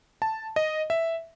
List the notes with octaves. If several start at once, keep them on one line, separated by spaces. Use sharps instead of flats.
A5
D#5
E5